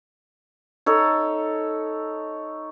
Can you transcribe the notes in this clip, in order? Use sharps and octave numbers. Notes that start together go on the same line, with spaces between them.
D#4 A4 C#5